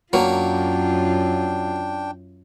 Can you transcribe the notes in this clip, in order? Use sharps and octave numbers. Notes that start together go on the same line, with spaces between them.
F#2 F#3 A#3 D4 F4 G5